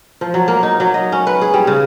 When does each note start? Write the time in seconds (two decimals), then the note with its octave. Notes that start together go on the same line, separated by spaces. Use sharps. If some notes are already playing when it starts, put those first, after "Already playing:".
0.21 F3
0.34 F#3
0.48 A#3
0.63 D#4
0.80 F#3
0.94 D#5
1.12 C#4
1.27 B4
1.41 G#4
1.54 G3
1.67 C#3